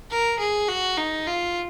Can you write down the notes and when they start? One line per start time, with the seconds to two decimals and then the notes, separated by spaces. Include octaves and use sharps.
0.11 A#4
0.39 G#4
0.69 F#4
0.97 D#4
1.27 F4